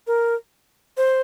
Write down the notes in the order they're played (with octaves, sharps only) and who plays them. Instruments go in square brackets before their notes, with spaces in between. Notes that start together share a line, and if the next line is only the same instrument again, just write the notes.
[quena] A#4
C5